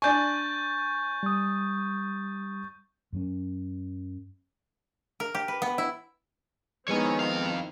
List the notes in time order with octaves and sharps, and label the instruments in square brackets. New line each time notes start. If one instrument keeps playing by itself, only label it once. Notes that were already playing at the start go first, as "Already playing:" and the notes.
[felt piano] D4 D5 G#5 [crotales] C#6 G6 A6
[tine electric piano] G3 D#6
[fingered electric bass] F#2 F#3 C#4
[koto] A#4
G4
B4
B3
E4
[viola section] D#3 C4 E4 [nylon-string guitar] F3 G#3 B3 [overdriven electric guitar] C#5 G#5
[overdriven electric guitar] F2 F5